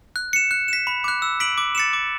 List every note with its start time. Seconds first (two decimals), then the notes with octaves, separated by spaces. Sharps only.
0.16 F#6
0.33 C#7 E7
0.51 F#6
0.68 B6 E7
0.87 B5
1.04 D6 F#6
1.22 E6
1.40 B6 D7 F#7
1.58 D6
1.75 A6 C#7 E7
1.93 D6